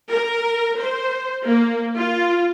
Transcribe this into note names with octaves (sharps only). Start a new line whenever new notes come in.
A#4
C5
A#3
F4